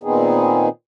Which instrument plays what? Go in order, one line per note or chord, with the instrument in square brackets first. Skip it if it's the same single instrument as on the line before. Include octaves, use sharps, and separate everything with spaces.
[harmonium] A#2 D#3 B3 C4 D#4 G#4